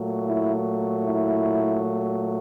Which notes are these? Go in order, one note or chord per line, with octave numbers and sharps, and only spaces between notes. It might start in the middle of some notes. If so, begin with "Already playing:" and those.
Already playing: A#2 F#3 A3
E4
E4